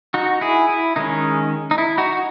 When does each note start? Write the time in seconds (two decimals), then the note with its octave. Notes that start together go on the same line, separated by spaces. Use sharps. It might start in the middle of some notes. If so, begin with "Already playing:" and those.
0.14 D#4 F#4
0.41 E4 G#4
0.69 E4
0.96 D#3 G#3 C#4 D#4
1.71 D#4
1.78 E4
1.98 D#4 F#4